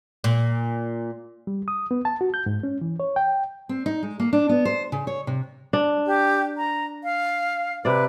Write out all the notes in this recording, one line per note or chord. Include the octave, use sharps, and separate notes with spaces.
A#2
G3
D#6
B3
A5
F#4
G6
G#2
C#4
E3
C#5
G5
C4
D#4
G#3
A#3
D4
B3
C5
C#3
C#5
C3
D4
G4
A#5
F5
C3 B4 D5